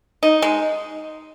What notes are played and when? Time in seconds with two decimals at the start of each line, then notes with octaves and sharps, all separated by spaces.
0.23 D#4
0.42 G#3